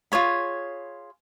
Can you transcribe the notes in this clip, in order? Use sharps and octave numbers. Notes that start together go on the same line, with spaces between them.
F4 G#4 C#5 B5